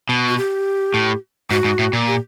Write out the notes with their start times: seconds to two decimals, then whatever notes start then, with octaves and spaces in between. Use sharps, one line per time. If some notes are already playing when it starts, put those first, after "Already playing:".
0.09 B2
0.28 F#4
0.37 G4
0.94 A2
1.51 G#2 F#4
1.64 G#2
1.79 A2
1.93 A#2
2.07 G4